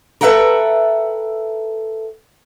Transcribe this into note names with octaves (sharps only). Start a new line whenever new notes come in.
A4 B4 E5 F#5 G5 A#5